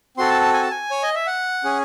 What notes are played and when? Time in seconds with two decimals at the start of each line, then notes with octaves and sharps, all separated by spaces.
0.17 C4 F#4 A4 C6
0.29 A5
0.42 A5
0.53 G#5
0.63 A5
0.71 G#5
0.91 C#5
1.03 D#5
1.15 E5
1.27 F#5
1.64 C#4 G#4